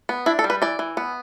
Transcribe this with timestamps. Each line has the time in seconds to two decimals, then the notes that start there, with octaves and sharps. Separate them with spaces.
0.09 B3
0.26 D4 E4
0.39 A4
0.44 G3
0.50 B4
0.62 E3 D5
0.79 E3
0.97 B3